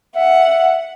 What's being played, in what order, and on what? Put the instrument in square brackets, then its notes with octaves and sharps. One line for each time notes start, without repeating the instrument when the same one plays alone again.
[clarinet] E5 [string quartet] F#5